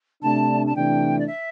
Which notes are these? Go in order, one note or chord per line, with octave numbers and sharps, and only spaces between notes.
C3 A3 D4 A5
A5
C3 E3 A3 D4 G5
D5
E5